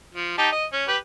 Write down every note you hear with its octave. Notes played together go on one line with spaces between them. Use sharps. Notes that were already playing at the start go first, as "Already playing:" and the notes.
F3
D#4 G4 A5
D#5
C#4
G4 B4